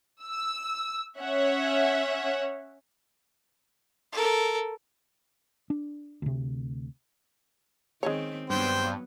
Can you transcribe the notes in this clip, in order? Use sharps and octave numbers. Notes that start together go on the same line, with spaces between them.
E6
C#4 C#5 E5 F#5
A4 A#4
D4
D2 C3
D#3 G#3 C4 C#4 C#5
G2 F#3 B3 C5 G5